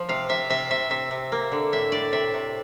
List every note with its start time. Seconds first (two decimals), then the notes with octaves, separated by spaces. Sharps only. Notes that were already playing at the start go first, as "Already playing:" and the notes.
Already playing: F3
0.09 C3 F5
0.29 C3 E5
0.50 C3 E5
0.70 C3 E5
0.90 C3 E5
1.11 C3
1.32 A#3
1.52 D3
1.72 A2 E5
1.92 A2 D5
2.12 C3 E5
2.34 C3